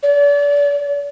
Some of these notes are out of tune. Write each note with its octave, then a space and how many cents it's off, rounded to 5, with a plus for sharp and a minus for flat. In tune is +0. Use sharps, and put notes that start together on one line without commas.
D5 -35